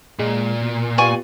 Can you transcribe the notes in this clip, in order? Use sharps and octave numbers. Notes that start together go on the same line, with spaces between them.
A#2 G#3
B2
B3 F4 G4 D5 G#5 C#6